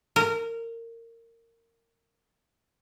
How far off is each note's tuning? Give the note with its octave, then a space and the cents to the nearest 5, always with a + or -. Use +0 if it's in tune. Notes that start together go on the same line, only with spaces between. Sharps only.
A#4 -20